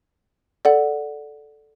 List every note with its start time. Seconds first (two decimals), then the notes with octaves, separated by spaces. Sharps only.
0.65 A4 D5 F#5